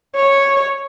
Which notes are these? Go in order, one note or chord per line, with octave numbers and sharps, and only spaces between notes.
C#5